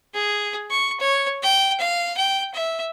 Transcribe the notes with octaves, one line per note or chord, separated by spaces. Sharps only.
G#4
C#6
C#5
G5
F5
G5
E5